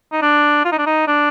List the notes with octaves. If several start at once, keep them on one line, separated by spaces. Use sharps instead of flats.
D#4
D4
F4
D#4
D4
D#4
D4